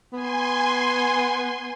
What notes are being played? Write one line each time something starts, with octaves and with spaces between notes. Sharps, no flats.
B3 G#5 C6